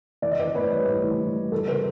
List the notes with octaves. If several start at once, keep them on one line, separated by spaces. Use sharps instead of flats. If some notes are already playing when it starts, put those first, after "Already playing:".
E3 D5
D#5
E3 C5 D5
A2 B4 C#5
G3
A2
E3
E3
G3
C#3 A4 B4
C#3 A#4 C5